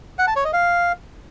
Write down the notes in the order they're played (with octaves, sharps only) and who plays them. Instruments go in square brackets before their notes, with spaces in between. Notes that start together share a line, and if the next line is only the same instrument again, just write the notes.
[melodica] F#5
A5
C#5
D#5
F5